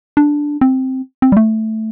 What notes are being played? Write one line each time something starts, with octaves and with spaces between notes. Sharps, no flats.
D4
C4
C4
G3
A3